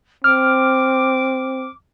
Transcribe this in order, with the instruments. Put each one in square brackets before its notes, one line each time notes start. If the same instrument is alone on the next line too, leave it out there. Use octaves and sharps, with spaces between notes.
[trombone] C4 [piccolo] D6 [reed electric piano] F6